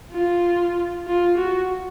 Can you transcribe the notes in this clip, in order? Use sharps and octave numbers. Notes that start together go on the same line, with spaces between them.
F4
F4
F#4